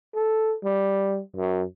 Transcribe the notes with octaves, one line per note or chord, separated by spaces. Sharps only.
A4
G3
F#2